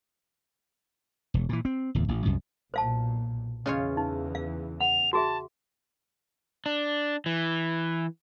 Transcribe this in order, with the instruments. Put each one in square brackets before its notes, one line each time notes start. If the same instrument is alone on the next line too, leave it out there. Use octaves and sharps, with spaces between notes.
[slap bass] E1
A#2 E3
C4
D1 E2
A1
C2 F#2
[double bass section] B1 A#2 [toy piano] C5 F5 A5
[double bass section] E2 E3 [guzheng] C#3 F4 C#5
[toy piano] D#4
F5
[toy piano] F#5 [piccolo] F7
[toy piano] F#4 G#4 E5 [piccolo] A5
[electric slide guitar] D4
E3